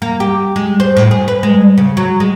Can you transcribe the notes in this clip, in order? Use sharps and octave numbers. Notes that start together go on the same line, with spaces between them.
A#3
G4
G#3
C5
A2
G#4
B4
G#3
C#3
F#3
G#3